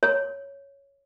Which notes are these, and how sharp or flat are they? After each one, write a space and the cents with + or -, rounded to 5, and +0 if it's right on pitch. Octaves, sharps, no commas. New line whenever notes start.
C#5 +5